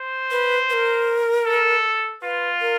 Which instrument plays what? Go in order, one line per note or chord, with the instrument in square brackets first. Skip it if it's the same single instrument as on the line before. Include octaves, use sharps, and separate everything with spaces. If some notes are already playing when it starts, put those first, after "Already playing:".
Already playing: [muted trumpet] C5
[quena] B4
B4
A#4
[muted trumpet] A4
[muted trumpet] F4 [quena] B4
[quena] A#4